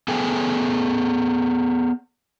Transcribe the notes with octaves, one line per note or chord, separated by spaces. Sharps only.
B3 G#4 A4 G5 G#5